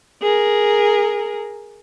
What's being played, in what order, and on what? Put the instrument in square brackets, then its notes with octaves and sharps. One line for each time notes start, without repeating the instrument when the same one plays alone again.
[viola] G#4 A#4